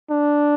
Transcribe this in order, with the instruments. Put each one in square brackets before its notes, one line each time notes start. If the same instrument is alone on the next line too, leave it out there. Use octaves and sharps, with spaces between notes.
[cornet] D4